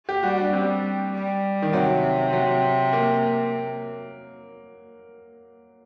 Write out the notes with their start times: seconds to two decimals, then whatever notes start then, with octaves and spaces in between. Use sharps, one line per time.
0.09 G4
0.23 G3 F#4
0.38 D4
0.53 G3 C4
1.13 G3
1.62 D#3
1.73 C3 F#3
2.33 F#3
2.93 A#3